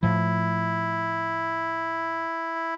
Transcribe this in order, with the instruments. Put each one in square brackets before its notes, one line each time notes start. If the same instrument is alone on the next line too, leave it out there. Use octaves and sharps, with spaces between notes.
[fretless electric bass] A2 F3 [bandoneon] E4